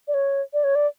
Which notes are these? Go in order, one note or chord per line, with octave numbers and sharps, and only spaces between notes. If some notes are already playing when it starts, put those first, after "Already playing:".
D5
C#5
D5
C#5
D5